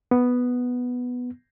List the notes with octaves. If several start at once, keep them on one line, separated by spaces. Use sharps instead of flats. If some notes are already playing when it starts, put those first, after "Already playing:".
B3